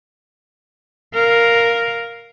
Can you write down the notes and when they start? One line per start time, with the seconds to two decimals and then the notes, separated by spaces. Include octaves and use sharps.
1.14 A#4 F5